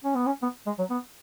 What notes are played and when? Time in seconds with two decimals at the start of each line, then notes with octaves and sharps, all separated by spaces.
0.04 C#4
0.15 B3
0.26 C#4
0.43 B3
0.66 G#3
0.78 F#3
0.90 B3